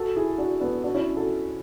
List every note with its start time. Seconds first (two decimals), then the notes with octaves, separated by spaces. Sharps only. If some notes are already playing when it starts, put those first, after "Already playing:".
Already playing: F#4 A4
0.16 E4 G#4
0.38 D4 F#4
0.60 B3 D4
0.83 D4 F#4
0.94 C#4 E4
1.16 F#4 A4